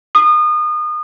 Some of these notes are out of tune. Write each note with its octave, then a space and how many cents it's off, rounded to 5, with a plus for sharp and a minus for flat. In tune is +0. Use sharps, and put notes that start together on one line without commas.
D#6 -30